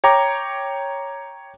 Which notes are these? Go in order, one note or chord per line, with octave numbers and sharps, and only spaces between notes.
C#5 G5 A#5 D6